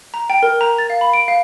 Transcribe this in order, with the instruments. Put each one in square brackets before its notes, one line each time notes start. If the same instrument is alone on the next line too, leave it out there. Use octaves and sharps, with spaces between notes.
[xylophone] A#5
G5
A#4
A#5
A6
F5
B5
D7
F5